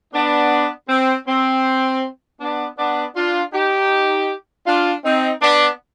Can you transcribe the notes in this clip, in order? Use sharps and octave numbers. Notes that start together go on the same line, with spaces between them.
B3 D4
C4
C4
B3 D4
B3 D4
D4 F4
D#4 G4
D4 F4
C4 D#4
B3 D4